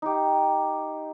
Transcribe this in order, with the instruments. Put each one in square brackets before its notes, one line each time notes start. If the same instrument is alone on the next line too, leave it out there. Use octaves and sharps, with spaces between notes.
[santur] D#4 G4